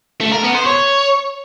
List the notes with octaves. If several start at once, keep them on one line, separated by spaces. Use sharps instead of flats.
A3
A#4
B3
C5
C#5